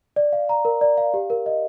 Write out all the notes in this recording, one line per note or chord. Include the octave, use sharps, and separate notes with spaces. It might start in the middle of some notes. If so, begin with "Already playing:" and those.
D5
F5
A#5
A#4
D5
F5
G4
A#4
D#5